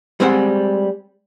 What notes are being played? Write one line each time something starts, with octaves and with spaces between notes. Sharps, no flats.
G3 G#3 C4 C5 E5 F#5